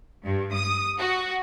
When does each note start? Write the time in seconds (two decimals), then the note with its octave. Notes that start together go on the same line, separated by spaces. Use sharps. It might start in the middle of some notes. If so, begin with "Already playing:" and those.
0.25 G2
0.54 D#6
0.98 F#4